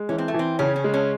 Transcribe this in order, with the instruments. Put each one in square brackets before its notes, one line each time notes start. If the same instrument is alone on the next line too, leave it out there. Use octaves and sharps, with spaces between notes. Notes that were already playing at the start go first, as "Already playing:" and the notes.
Already playing: [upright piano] G#3
[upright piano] E3 [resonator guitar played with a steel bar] C#4
[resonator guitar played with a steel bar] C4
A3
[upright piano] E3 [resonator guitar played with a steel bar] C4
[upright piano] C#3 [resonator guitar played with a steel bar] C#4
[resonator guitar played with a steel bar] C#4
[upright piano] G#3
[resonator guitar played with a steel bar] C#4